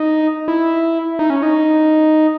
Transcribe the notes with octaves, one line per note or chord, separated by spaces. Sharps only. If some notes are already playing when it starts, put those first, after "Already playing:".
Already playing: D#4
E4
D#4
C#4
D#4